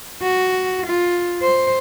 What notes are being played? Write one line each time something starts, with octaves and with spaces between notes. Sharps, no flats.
F#4
F4
C5